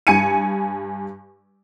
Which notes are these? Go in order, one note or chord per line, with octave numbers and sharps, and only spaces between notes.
G2 G#5 C#7 D#7